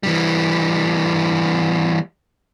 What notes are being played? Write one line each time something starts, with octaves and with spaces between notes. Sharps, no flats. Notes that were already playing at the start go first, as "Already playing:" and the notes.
E3 G3